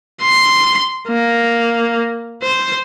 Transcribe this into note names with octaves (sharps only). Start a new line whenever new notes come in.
C6
A#3
C5